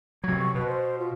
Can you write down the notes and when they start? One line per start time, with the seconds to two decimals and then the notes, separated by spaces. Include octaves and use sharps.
0.24 C3 F#3 G#6
0.38 C#6
0.55 B2 B4
0.66 C5
0.98 F4